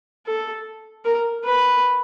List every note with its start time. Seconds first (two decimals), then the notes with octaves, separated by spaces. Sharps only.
0.26 A4
1.05 A#4
1.44 B4